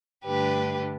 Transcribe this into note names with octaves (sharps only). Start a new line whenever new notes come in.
G2 D3 A3 D4 G4 B4